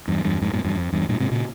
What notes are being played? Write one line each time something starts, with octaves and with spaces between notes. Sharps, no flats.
E2 G2
E2 G2
F2 G#2
G2 A#2
E2 G2
F2
E2 G2
G2 A#2
G#2 C3
A#2 C#3